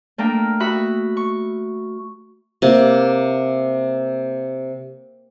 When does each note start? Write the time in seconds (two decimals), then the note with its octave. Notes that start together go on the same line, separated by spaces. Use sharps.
0.18 A3 A#3 D4 A#4 G5
0.60 F#4 E5 B5 D#6 F#6
1.17 C#6
2.62 C3 A#3